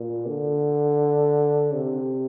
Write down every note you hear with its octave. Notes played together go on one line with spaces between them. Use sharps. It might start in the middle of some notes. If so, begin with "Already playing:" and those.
Already playing: A#2
D3
C3